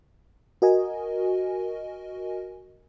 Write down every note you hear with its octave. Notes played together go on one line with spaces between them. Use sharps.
F#4 A#4 D#5 G#5